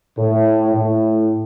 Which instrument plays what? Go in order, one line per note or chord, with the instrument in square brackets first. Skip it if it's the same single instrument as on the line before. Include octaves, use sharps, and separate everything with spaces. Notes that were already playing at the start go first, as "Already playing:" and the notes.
[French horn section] A2
A2